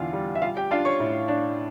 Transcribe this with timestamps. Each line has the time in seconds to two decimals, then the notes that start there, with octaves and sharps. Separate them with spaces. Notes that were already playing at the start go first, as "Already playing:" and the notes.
Already playing: E2 D3 D4 F4 F5
0.13 G3
0.35 E5
0.42 G3 F4 F5
0.57 G4 G5
0.71 D4 F4 F5
0.85 C#5 C#6
1.00 A2
1.28 D4